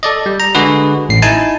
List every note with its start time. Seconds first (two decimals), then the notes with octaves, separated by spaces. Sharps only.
0.03 A4 D5 D#5
0.26 G3
0.40 A#5
0.55 D3 G#3 F#4 G#4 B4
1.09 A1 C7
1.22 D#4 E4 G#5 A5